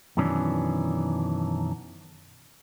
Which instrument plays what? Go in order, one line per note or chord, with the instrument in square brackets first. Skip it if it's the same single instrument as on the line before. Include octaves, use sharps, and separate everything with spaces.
[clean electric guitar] F#2 B2 D#3 E3 C#4 D4